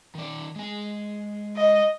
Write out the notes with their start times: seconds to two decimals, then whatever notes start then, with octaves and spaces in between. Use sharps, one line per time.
0.15 D#3 D5
0.56 G#3 G#5
1.56 D#5